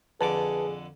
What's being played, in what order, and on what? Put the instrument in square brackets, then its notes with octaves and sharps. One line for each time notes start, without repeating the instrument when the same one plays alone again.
[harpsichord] F2 D3 D6 [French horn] G#4 [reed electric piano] B4 A5